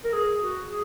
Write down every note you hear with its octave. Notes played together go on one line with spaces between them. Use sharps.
A#4
G#4
F#4
G#4